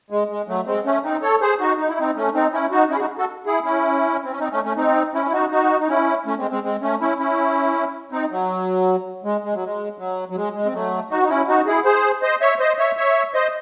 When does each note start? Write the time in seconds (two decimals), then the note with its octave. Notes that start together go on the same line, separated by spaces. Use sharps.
0.10 G#3
0.29 G#3
0.48 F#3 A3
0.66 G#3 C4
0.85 A3 C#4
1.04 C4 D#4
1.22 A4 C#5
1.41 G#4 C5
1.60 D#4 F#4
1.78 D#4
1.89 E4
1.99 C4 D#4
2.16 A3 C#4
2.34 C4 D#4
2.53 C#4 E4
2.71 D#4 F#4
2.90 C#4 E4
2.95 G#4
2.99 D#4 F#4
3.18 F#4 A4
3.46 E4 G#4
3.65 C#4 E4
4.24 C4
4.32 C#4
4.40 C4 D#4
4.52 A3 C#4
4.64 A3 C#4
4.77 C4 D#4
5.14 C#4 E4
5.26 E4
5.33 D#4 F#4
5.51 D#4 F#4
5.80 D#4
5.89 C#4 E4
6.26 A3 C#4
6.38 G#3 C4
6.51 G#3 C4
6.63 G#3 C4
6.82 A3 C#4
7.01 C#4 E4
7.19 C#4 E4
8.12 C4 D#4
8.31 F#3
9.24 G#3
9.44 G#3
9.54 F#3
9.64 G#3
9.98 F#3
10.30 F#3
10.36 G#3
10.55 G#3
10.65 C4
10.73 F#3 A3
11.11 D#4 F#4
11.23 D#4
11.29 C#4 E4
11.48 D#4 F#4
11.66 E4 G#4
11.85 G#4 C5
12.22 C5 D#5
12.41 C#5 E5
12.60 C5 D#5
12.78 C#5 E5
12.97 C#5 E5
13.34 C5 D#5